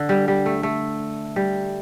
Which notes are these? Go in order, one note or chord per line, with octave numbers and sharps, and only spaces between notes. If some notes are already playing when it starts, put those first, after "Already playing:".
Already playing: D3
G3
G3
A3
A3
G3